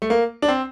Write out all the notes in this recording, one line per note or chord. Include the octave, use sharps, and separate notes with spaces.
A3
A#3
D4
C4